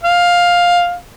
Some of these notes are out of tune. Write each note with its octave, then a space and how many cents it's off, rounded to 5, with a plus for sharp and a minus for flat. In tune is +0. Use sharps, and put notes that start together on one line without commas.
F5 +10